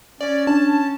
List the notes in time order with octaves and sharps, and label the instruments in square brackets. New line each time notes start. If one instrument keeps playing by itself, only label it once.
[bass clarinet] C#4 [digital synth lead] D5
[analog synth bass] D4 [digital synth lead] A5